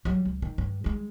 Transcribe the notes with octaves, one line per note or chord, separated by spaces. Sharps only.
F#3 G3
C#2
D#3
G2
G3 G#3